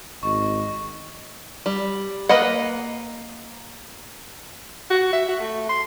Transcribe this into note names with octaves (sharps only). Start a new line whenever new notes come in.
G#1 D#5 C#6
G3
A#3 B4 D#5 F#5
F#4
E5
F#4
A3
C6